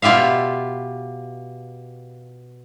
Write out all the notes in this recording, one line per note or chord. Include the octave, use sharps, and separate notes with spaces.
B2 F4 G4 E5 F5